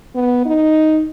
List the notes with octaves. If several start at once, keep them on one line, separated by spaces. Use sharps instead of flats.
B3
D#4